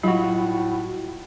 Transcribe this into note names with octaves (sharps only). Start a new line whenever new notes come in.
A2 F#3 G3 D#4 F4 F#4 B5